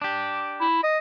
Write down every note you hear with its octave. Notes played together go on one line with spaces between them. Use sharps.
D4 G4
E4
D#5